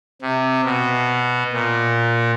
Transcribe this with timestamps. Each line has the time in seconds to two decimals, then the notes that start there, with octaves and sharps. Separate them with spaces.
0.22 C3
0.65 B2
1.53 A#2